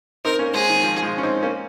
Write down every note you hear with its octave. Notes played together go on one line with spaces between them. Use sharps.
C4 D#4 A#4
A#3 C#4
G#3 C4 G#4
D#3
F3
F3 G#3
C#4
C4 D#4
A#3 C#4